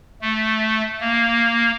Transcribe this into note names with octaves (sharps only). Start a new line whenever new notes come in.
A3
A#3